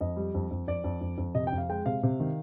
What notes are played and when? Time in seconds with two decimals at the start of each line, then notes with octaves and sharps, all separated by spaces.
0.01 F2 D#5
0.16 G3
0.35 F2
0.51 F2
0.68 F2 D5
0.84 F2
1.01 F2
1.18 F2
1.35 C3 D#5
1.47 G5
1.52 F2
1.58 F5
1.70 G#3 G5
1.86 C3 F5
2.03 C3
2.20 D#3